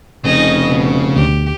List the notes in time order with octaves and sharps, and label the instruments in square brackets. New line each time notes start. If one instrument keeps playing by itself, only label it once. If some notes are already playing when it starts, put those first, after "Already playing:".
[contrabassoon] F1 [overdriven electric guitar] C#3 [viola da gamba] D#4 D#5
[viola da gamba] B2
[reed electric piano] D2 [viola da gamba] G4